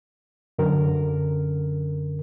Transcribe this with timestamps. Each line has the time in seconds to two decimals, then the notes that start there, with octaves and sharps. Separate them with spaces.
0.59 F#2 D3 A#4